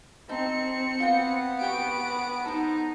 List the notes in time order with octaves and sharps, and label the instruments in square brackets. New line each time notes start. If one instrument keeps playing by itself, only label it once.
[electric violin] C4 C#7 [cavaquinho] D#4 A4
[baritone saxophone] B3 [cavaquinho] F4 G5
[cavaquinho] G4 G5 C#6 [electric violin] D7
[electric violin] D#4 [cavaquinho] A4 C5